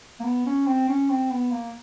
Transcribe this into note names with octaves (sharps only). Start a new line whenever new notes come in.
A#3
B3
C#4
C4
C#4
C4
B3
A#3